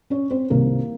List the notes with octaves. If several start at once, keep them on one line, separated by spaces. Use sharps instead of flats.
C#4 C#5
C4 C5
C2 C3 D#3 A#3 A#4